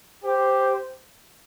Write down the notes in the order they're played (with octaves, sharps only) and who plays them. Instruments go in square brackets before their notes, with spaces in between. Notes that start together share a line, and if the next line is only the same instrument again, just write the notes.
[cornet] G4 [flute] C5